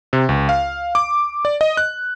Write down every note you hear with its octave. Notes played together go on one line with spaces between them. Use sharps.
C3
C#2
F5
D6
D5
D#5
F#6